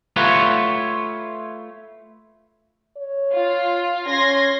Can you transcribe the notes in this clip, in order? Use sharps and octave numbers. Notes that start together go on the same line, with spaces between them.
A3 F4 B4 C#5 F#5
C#5
F4
C#4 C6 G#6 A#6